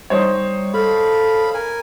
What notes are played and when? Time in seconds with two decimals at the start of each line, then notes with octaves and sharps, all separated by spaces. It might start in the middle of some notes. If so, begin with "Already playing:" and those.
0.10 G3 D#4 C5 C#5
0.74 A4 F5 B5
1.54 A#4 G#5